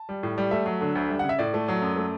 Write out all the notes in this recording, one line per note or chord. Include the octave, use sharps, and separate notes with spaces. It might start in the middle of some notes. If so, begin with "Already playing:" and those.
Already playing: A5
G3
A2
G3
A3 E5
F#3
D3
D2
G3
C#3 F#5
E5
A2 D5
A3
F#3
F#2
A3